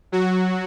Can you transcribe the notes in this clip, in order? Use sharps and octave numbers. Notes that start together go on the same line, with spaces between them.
F#3 F#4